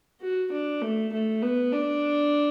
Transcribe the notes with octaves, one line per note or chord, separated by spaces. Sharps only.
F#4
D4
A3
A3
B3
D4